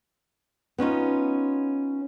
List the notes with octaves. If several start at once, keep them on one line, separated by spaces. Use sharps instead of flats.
B3 C#4 D#4 F4